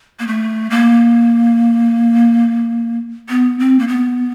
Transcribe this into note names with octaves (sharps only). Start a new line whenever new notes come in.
A#3
A3
A#3
B3
C4
A#3
B3